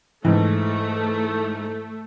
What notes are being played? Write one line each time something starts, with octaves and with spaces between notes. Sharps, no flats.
G#2 E3 A3